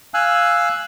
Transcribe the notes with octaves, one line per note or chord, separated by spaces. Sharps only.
F5 G#5 E6 F#6